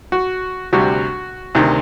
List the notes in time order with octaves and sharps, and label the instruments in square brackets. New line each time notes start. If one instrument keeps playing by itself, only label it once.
[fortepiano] F#4
D2 C3 G3 F#4
D2 C3 D#3